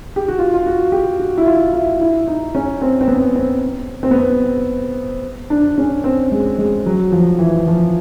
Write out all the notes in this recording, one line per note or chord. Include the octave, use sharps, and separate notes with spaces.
G4
F#4
F4
F4
F#4
G4
F#4
E4
F4
E4
E4
D#4
C#4
C4
C4
B3
C4
C4
B3
C4
D4
C#4
C4
G#3
G#3
F#3
F3
E3
F3